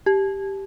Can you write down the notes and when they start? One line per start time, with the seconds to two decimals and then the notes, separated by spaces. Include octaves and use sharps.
0.06 G4